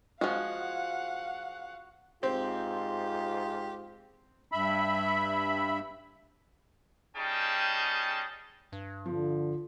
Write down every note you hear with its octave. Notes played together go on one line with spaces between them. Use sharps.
F3 G#3 F#4 F5 F#5
G#2 C4 F4 G4
G2 E5 B5
G3 C#4 D#4 G#4 G5 A5
G2
D3 F3